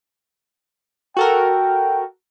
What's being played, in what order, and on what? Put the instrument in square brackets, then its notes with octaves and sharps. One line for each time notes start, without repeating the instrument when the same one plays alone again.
[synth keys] F#4 A4 A#4 [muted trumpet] G5